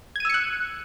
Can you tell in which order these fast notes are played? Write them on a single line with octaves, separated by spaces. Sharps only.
G#6 D#7 E6 C#7 F#6